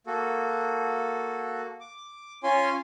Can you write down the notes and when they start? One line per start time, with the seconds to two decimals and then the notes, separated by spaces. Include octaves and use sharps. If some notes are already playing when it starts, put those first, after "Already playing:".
0.07 A#3 F#4 A4
1.81 D6
2.43 C#4 F4 C#5 G#5 C6